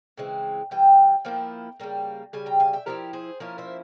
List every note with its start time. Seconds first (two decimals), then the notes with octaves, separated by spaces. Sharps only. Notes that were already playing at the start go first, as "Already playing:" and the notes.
0.18 C#3 E3 G#3 C4
0.71 E3 G3 G5
1.25 F3 A#3 E4 G5
1.80 C#3 G3 A#3
2.33 C#3 G3 G#5
2.46 G5 A#5
2.60 F5 G#5
2.73 E5 G5
2.86 F3 C4 E4 G4 A#4
3.13 G#4 C5
3.40 F3 A#3 C#4 E4 A#4 C#5
3.58 C5 E5